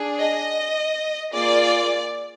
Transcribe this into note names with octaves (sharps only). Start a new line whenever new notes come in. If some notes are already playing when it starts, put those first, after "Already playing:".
Already playing: D4 G#4
D#5
A#3 F4 G#4 D5